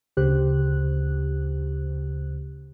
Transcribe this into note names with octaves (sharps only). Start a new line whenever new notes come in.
D2 C#3 G4 C5 F#6